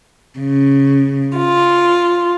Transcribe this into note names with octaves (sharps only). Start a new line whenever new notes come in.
C#3
F4